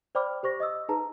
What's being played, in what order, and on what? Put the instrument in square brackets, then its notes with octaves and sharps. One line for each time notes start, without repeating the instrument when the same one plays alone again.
[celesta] C5 D5 G5 B5 D6 F6
G4 C5 C#6 A#6
D#5 D#6 E6
D#4 G#4 B4 A5 A#5